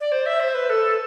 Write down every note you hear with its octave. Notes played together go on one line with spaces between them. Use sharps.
D5
C5
E5
C5
B4
A4